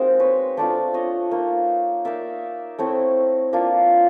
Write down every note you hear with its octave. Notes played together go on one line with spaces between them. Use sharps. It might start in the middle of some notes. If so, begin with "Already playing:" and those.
Already playing: G#3 A#3 C4 D#4 F#4 G#4 A#4 C5
B4 C#5
A3 D4 F4 C5 D5
C#5 D#5
A#3 D#4
A#3 D#4 D5 E5
A3 C4 E4 C#5 D#5
A#3 D4 F4